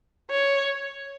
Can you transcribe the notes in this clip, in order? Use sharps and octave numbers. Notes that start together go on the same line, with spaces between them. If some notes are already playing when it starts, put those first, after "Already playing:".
C#5